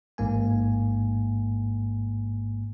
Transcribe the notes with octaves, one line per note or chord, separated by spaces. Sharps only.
A1 G#2 A#3 G#5